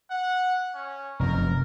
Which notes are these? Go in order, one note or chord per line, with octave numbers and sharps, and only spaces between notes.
F#5
C#4
F1 F#2 A#4